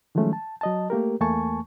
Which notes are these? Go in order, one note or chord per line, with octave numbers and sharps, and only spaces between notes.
D#3 F3 F#3 G#3 A3 C#4
A5
F#3 D#5 A5
A3 A#3 G4 A#4
E2 A3 A#3 G#5 A5 C#6